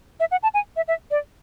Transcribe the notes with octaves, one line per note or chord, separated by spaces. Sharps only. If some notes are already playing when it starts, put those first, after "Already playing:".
E5
F#5
A5
G#5
E5
E5
D5